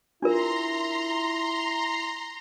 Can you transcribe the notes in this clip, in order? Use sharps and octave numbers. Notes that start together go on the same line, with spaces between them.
D4 E4 F4 A#4 A#5 C6